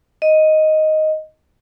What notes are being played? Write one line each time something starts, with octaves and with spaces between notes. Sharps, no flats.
D#5